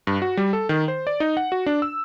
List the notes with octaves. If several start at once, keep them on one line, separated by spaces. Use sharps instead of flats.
G2
F#4
G3
A4
D#3
C5
D5
D#4
F#5
F#4
D4
E6